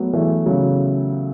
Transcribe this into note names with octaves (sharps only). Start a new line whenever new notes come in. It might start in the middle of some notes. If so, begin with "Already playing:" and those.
Already playing: F#3 A3 B3
E3 A3
C#3 F#3